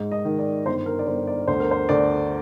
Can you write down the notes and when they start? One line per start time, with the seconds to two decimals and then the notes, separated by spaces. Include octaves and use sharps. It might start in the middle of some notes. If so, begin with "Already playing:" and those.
Already playing: G#2
0.12 D#5
0.25 D#3
0.39 D5
0.66 G1 C5
0.86 A#4
0.99 D5
1.07 G1 C5
1.27 D5
1.48 D2 C5
1.60 A#4
1.71 C5
1.89 D2 D5